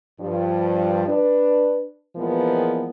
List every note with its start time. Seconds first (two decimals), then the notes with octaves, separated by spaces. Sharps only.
0.20 G2 F3
1.08 D4 B4
2.16 A#2 E3 F3 G#3 B3 A#4